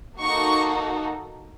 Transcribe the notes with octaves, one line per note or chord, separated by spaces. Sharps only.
A#3 D#4 F#4 A4 C#6